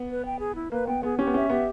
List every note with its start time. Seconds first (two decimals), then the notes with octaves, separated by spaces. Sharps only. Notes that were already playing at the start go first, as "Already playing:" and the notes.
Already playing: B3
0.10 B4
0.25 G5
0.40 G#4
0.56 E4
0.71 A#3 B4
0.87 B3 G5
1.03 B3 G#4
1.18 C#4 G4
1.27 B3
1.34 C#4 E5
1.50 B3 G4